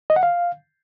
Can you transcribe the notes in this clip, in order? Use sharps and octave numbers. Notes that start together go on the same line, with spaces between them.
D#5
F#5
F5